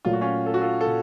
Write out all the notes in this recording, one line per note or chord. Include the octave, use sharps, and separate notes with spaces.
A#2 F#3 A3 F4
F#4
C#4 F4
A4
F#4
F4 A4
A4
A#2